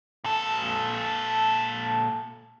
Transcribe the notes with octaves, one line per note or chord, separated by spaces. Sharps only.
A#2 A4